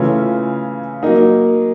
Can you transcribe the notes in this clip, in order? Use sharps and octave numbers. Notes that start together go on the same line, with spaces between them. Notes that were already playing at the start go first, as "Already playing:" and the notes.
Already playing: C#3 E3 A3 C#4 F4
F#3 A#3 D#4